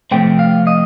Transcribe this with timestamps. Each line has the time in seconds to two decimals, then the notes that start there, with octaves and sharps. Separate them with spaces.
0.11 C3 F3 A3 C4 G5
0.39 F5
0.67 D#5